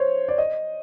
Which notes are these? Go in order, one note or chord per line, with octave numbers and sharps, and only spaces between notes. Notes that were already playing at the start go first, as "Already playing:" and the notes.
Already playing: C5 C#5
D5
D#5